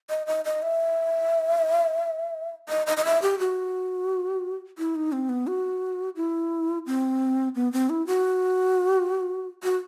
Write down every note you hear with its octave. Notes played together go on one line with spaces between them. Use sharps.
D#5
D#5
D#5
E5
D#5
D#5
D#5
E5
G4
F#4
E4
D#4
C4
B3
F#4
E4
C4
B3
C4
E4
F#4
F#4